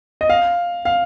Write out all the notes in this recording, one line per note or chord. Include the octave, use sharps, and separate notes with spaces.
D#5
F5
F5